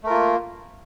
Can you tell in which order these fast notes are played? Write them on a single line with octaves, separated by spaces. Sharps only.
A3 A#4 F4 A#3